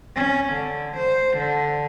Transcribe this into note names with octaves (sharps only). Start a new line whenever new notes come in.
C#4
D3
C5
D3